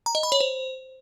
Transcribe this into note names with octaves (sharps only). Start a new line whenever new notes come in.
A#5
D#5
B5
C#5
C5